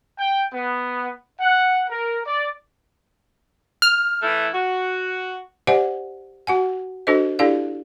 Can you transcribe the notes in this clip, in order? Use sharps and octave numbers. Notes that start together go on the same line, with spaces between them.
G5
B3
F#5
A#4
D5
F6
E3 A3 E4
F#4
G4 C5 D5 E5 F#5 G#5
F#4 F#5 G#5
D4 F#4 A4 C5 D#5
D4 E4 G4 A4 D5 F5